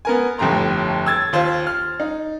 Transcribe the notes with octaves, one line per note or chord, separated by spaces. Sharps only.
B3 A#4 G#5
G1 F2 A2 G4 A#5 C6
E6 G#6 A6
D#2 F4 C5
F6
D#4